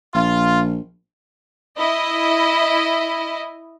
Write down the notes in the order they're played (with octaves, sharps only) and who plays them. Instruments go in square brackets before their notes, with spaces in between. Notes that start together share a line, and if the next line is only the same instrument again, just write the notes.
[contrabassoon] A#1 [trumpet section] F4
[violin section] E4 D#5